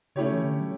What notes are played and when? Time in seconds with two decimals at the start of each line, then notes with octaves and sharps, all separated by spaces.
0.15 C#3 A3 C#4 E4 G4 C#5
0.32 E3
0.44 D3
0.61 F#3